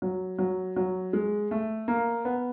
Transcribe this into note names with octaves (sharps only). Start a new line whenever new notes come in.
F#3
F#3
F#3
G#3
A3
A#3
B3